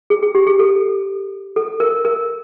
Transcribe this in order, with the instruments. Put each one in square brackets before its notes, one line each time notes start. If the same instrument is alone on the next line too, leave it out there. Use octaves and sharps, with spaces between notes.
[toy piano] G#4
G#4
G4
G#4
A4
A4
A#4
A#4